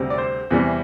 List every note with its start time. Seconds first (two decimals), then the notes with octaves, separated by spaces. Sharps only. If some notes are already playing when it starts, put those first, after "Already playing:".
Already playing: D2 C3 G3 C4
0.10 D5
0.18 C5
0.51 E2 C3 E3 G3